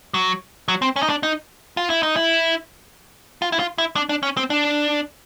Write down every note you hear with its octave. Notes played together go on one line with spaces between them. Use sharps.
F#3
F#3
C4
C#4
D#4
D4
D#4
F4
E4
D#4
E4
F4
E4
F4
E4
D4
D4
C#4
C4
D4